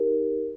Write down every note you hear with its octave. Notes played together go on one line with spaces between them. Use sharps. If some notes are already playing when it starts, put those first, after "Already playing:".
Already playing: D#4 G4 A#4